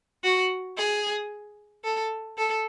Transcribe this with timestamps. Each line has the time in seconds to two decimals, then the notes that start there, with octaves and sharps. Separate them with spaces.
0.24 F#4
0.77 G#4
1.84 A4
2.38 A4